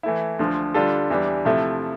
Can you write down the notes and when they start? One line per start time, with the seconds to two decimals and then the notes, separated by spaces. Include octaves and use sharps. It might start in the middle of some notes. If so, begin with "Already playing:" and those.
0.03 E3 A3 E4
0.39 D2 D3 F3
0.74 D3 G3 D4 F4 A4
1.10 E2 E3 G3 D4
1.45 C3 F3 A3 E4